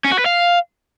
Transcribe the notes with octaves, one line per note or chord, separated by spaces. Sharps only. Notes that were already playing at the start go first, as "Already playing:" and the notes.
C#4
F#4
B4
F5